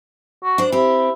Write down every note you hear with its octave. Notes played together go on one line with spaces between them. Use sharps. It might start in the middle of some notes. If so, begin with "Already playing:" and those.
F#4
D4 C5
C4 E4 G4